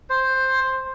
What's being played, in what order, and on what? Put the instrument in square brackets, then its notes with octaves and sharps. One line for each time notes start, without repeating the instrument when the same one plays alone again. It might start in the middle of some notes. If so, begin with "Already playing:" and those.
[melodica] C5